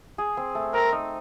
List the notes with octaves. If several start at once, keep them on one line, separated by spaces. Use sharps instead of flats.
G#4
C4
A3
C4 A#4
D#4